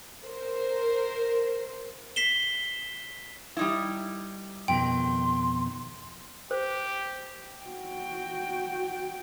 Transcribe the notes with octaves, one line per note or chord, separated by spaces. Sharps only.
A#4 C5
B6 C7 E7 G7
G3 D#4 E4
F2 B2 D#3 G5 C6
G4 C5
F#4 G5